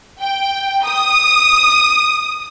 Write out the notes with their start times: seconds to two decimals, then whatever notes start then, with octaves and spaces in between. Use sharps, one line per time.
0.20 G5
0.85 D#6